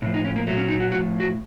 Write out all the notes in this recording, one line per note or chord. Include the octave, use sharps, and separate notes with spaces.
A2 F3
D#4
C#4
A#3
A#2 F#3 A3
C#4
D#4
F#4
A2 F3 F#4
F#4